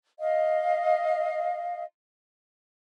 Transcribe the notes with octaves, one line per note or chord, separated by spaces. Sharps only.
D#5 F5